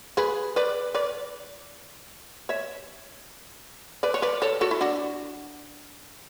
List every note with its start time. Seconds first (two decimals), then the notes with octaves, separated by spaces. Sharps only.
0.17 G#4 B4
0.56 B4 D5
0.95 B4 D5
2.49 C#5 E5
4.03 B4 D5
4.14 C#5
4.22 B4 D5
4.42 A4 C#5
4.61 F#4 A4
4.71 E4
4.81 D4 F#4